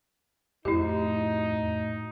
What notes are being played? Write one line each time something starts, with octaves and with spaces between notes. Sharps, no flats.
F2 A2 D#4 E4 F#4 G4 C5